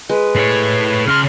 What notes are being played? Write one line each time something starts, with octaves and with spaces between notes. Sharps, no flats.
G#3 B4
A2 C#5
C#3 C6 F6